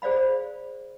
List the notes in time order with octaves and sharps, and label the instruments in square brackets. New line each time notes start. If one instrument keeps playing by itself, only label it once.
[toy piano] G#4 C5 D5 F5 B5